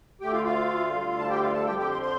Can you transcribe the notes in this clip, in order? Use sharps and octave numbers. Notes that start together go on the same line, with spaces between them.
D2 D3 A3 G4 G5
F4 F5
F4 F5
D2 D3 G3
A5
G4 G5
F4 F5
A4 A5
F2 D3 F3 G4 G5
G4 G5
C5 C6
C5 C6